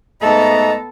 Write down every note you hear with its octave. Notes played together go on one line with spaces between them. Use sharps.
G#2 A3 B3 A4 D#5 A#5